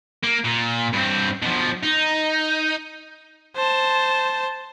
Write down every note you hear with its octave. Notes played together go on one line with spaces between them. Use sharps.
A#3
A#2
G2 C4
B2 F3
D#4
C5 A5